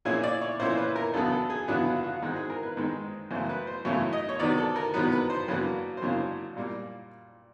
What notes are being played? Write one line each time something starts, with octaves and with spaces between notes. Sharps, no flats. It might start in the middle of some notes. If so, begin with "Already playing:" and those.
A#2 F3 A#3 C#4 E4 G#4
D5
C#5
A#2 F3 A#3 C#4 E4 C5
B4
A#4
E2 C#3 F#3 B3 D4 A4
A4
G#4
E2 C#3 F#3 B3 D4 F#4
F4
F4
F#4
G#2 D#3 G#3 C4 F#4
G#4
A#4
B4
G#2 D#3 G#3 C4
F#2 C#3 E3 A3 C5
B4
C5
F#2 C#3 E3 A3 C#5
D#5
C#5
C3 D#3 F#3 B3 D5
A4
A#4
C3 D#3 F#3 B3 B4
B4
C5
F#2 C#3 F#3 A#3 D4 B4
C5
F#2 C#3 F#3 A#3 D4 C#5
A#2 G3 A#3